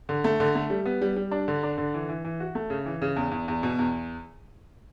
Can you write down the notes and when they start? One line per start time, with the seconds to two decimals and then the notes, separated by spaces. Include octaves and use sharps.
0.09 D3
0.24 A3
0.40 D3
0.55 A3
0.70 G3
0.86 B3
1.01 G3
1.16 G3
1.31 D4
1.48 D3
1.63 D4
1.78 D3
1.94 E3
2.09 E3
2.25 E3
2.40 F#4
2.55 A3
2.70 C#3
2.86 E3
3.02 C#3
3.16 E2
3.31 E2
3.48 E2
3.63 B2
3.79 E2